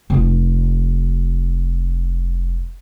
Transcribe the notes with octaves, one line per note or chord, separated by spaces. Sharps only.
F1 F4